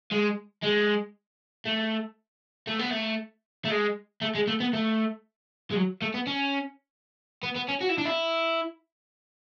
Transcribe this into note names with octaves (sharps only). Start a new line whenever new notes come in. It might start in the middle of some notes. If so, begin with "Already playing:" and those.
G#3
G#3
A3
A3
B3
A3
A3
G#3
A3
G#3
A3
B3
A3
G#3
F#3
A3
B3
C#4
B3
B3
C#4
F#4
E4
D4
E4